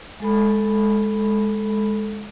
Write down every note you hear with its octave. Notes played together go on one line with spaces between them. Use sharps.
G#3 A4 B5